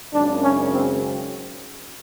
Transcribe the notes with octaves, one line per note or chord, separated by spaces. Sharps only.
G#1 F#2 C#3 D4
C#4
C4